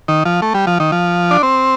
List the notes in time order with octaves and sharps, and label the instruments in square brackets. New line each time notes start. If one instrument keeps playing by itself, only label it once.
[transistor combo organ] D#3
F3
A3
G3
F3
D#3
F3
D4
C4